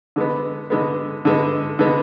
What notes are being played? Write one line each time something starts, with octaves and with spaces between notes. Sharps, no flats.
D3 G#3 B3
D3 G#3 B3
D3 G#3 B3
D3 G#3 B3